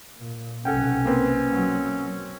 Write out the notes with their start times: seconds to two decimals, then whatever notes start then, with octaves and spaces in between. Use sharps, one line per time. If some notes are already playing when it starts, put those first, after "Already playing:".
0.17 A#2
0.65 B1 C3 C#4 A4 F#5 G5
1.05 A#3 C4 B4
1.50 F#3